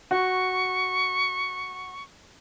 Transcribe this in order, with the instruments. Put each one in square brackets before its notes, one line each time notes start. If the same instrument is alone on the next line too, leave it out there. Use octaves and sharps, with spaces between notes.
[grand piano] F#4 [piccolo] C#6